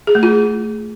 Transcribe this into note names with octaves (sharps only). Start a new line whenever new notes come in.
G#4
A3
F4